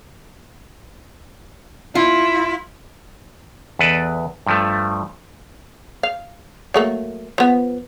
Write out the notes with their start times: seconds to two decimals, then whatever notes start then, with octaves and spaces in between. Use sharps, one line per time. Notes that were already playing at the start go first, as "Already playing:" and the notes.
1.95 E4 F4
3.79 E2 A4 B4 D5 D#5
4.47 G2 F3 A3
6.03 F5
6.74 F#3 A3 A#3
7.38 F3 B3